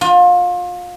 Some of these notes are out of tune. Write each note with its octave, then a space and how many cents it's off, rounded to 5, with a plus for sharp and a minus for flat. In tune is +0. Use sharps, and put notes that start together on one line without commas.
F4 +30